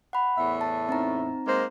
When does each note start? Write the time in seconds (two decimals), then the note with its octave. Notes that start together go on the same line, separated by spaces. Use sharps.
0.13 F#5 B5
0.36 E2 A2 E5
0.61 A5
0.89 C4 D#4 A#5
1.46 G#3 A#3 C5